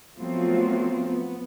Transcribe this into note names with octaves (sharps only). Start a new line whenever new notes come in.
F3 F#3 A3 B3 C4 F4
B3